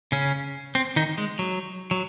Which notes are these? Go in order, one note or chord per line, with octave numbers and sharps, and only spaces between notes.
C#3 C#4
C4
D#3 D#4
G#3
F#3
F#3